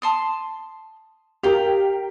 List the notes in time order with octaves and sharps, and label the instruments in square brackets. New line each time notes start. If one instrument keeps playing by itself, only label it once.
[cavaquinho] A5 C6 D#6
[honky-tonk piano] G4 A#4 [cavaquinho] F5 G5